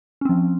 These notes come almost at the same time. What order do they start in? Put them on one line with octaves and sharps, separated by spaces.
C#4 C4 F3